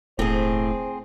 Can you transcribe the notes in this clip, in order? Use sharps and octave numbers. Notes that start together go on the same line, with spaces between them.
E1 A2 C4 G#4 C5